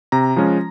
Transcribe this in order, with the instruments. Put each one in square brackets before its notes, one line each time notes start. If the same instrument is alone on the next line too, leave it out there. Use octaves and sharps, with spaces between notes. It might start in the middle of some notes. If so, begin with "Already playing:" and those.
[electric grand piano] C3 A#5
F3 G#3 C#4 F4